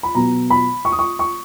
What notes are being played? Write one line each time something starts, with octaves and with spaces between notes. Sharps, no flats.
B5
B2 F#3 B3 A#5
B5
C#6
D#6
C#6
C#6